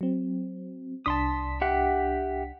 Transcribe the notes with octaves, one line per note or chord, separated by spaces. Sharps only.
F#3 C4
C2 D4 A5 C6 D#6 B6
G4 E5 F#5